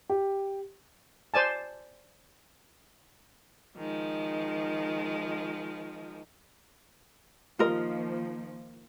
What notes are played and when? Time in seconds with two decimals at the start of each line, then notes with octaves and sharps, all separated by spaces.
0.10 G4
1.34 C5 D5 G#5 A5
3.76 D#3 F3 G#3
7.59 D#3 F3 A#3 F4 A#4 D#5